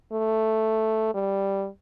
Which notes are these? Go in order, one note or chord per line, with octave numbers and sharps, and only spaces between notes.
A3
G3